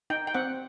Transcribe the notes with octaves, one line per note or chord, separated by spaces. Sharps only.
D#4 G5
G5
C4 F#5